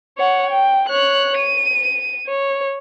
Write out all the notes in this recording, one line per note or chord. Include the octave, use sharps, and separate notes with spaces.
C#5 F#5
G5
C#5 F#6
D#7
C#5